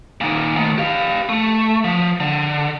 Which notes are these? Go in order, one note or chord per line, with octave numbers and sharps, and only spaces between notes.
A#2 D#3
D#3 A3
G4 F5
A3
F3
D3